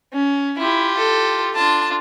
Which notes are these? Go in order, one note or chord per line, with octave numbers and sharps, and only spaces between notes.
C#4
E4 F4 G4
A4
D4 F4 A5